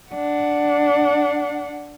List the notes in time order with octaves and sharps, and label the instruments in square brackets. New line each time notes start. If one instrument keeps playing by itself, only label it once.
[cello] D4 F#5